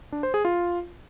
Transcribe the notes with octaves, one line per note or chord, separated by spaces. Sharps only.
D4
C5
G#4
F4